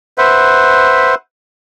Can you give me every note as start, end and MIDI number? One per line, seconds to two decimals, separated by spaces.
0.18 1.15 71
0.18 1.15 72
0.18 1.15 76
0.18 1.15 78